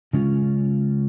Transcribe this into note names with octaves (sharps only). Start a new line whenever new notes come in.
C#3 G#3 C#4 F4